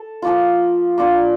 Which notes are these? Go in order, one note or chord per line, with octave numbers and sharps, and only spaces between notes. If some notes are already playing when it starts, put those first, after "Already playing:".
Already playing: A4
F3 A#3 F4
A#3 D4 F4